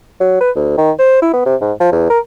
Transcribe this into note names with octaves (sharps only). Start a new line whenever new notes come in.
F#3
B4
D2
D#3
C5
E4
B3
C3
G#2
F3
E2
A#4